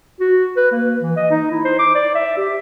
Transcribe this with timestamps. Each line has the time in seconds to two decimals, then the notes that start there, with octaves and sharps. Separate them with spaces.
0.20 F#4
0.57 B4
0.72 A#3
1.00 E3
1.17 D#5
1.31 D#4
1.51 E4
1.65 C5
1.79 D6
1.95 D5
2.15 E5
2.37 G4